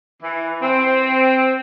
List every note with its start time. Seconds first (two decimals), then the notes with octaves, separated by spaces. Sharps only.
0.23 E3
0.62 C4